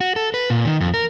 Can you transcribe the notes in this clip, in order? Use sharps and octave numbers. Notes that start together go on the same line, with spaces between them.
F#4
A4
B4
A#2
D#3
F2
A#4